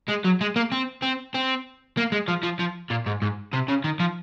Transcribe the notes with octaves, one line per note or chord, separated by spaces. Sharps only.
G#3
F#3
G#3
A#3
C4
C4
C4
A#3
G#3
F3
F3
F3
A#2
G#2
G#2
C3
C#3
D#3
F3